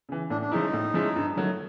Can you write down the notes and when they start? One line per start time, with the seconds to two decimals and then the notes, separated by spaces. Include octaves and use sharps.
0.09 C#3 E3
0.30 A2 D4
0.41 D4
0.51 F3 G#3 C#4 D#4 E4
0.73 A2
0.94 F3 G#3 C#4 E4
1.16 G2
1.37 D#3 F#3 A3